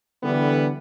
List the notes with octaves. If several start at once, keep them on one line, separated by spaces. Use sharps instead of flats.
D3 E3 G3 B3